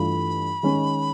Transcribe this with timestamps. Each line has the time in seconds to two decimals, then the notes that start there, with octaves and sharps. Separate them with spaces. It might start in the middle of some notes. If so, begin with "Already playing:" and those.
Already playing: G2 E3 A3 D4 F4 B5
0.63 D#3 G#3 C#4